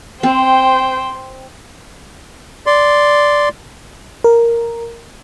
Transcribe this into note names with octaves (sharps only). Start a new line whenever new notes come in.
C4 C5 G5 C6
D5 C6
A#4